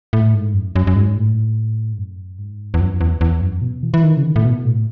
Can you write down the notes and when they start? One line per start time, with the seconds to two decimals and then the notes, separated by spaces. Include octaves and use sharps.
0.13 A2
0.34 G#2
0.54 F#2
0.76 F#2
0.87 F#2
0.96 G#2
1.17 A2
1.93 G#2
1.98 F#2
2.39 G#2
2.74 E2
2.81 F#2
3.01 E2
3.21 E2
3.41 F#2
3.62 B2
3.83 E3
3.94 E3
4.04 D#3
4.17 C#3
4.24 D#3
4.36 A2
4.45 B2
4.65 A2